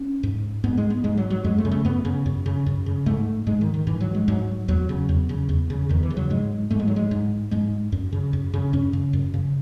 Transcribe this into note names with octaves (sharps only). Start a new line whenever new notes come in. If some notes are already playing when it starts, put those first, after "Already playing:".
Already playing: C#4
G#2
G#2 B3
G#3
B3
G#2 G#3
F#3
F#3
F#2 G#3
A3
C#3
A3
F#2 B3
C#3
F#2
C#3
F#2
C#3
G#2 A3
G#2 G#3
D#3
D#3
G#2 E3
F#3
G#3
G#2 F#3
E2 F#3
C#3
E2
C#3
E2
C#3
E2 D#3
E3
C#3
F#3
G#2 G#3
G#2 A3
G#3
F#3
G#3
G#2
G#2 G#3
F#2
C#3
F#2
C#3
F#2 C#4
C#3
F#2
C#3